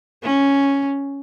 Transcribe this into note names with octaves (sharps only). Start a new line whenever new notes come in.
C#4